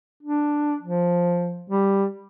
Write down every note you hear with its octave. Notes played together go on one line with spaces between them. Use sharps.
D4
F3
G3